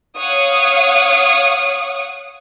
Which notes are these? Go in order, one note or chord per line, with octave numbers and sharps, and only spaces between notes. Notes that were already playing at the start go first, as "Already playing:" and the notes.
C#5 F5 F#5 D#6